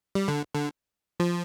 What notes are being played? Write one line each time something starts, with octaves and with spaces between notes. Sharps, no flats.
G3
D3
D3
F3